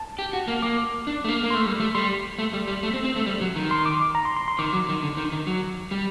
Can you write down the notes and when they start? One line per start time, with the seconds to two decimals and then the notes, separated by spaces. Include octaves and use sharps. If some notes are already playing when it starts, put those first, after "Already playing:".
Already playing: A5
0.19 G4
0.33 F#4
0.48 A#3
0.62 A#3 D6
1.07 D4
1.24 A3
1.28 A#3
1.43 A#3
1.50 A3 C6
1.66 G3
1.80 A3
1.95 G3 C6
2.38 A3
2.53 G3
2.68 G3
2.83 A3
2.93 C4
3.04 C4
3.16 A3
3.26 G3
3.41 F#3
3.56 D#3
3.71 C6
3.86 D6
4.15 A#5
4.25 C6
4.36 C6
4.48 C6
4.59 D#3 D6
4.73 F#3
4.89 D#3
5.03 D3
5.17 D#3
5.32 D#3
5.47 F#3
5.91 G3